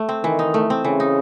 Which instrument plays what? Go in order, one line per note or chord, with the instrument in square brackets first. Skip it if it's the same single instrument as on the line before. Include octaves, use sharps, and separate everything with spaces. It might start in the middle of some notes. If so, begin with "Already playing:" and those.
Already playing: [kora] A3
C4
[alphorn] D#3 [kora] E3
[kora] D#4
A3
C4
[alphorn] C#3 [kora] E3
[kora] D#4